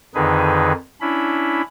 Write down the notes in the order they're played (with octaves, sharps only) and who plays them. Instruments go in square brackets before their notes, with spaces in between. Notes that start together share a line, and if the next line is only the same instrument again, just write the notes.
[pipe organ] F2 D3 D#3 D#4 G#4 B4
C#4 D4 E4 B5